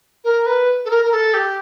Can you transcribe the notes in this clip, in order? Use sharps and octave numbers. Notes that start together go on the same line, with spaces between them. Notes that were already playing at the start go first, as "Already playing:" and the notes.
A#4
B4
A4
A#4
A#4
A4
G4